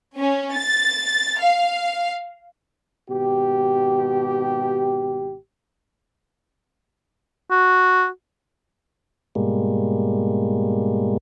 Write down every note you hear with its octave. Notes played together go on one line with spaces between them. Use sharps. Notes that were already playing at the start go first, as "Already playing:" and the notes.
C#4
A6
F5
G#1 B2 G4
F#4
G#2 B2 G3 G#3 A#3